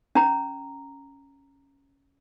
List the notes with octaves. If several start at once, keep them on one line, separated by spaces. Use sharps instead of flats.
C#4 A#5